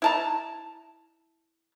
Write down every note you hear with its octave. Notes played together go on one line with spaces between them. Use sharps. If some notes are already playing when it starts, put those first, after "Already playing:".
E4 A5 A#5